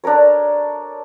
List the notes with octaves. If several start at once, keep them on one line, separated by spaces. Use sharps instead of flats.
D4 A4 A#4 C#5